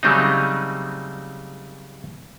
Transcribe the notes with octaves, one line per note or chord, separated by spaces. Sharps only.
C#3 F#3 G3 A3 C4 D#4